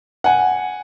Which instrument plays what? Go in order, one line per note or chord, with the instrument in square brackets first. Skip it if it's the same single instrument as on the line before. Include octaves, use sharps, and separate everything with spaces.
[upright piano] F#5 G#5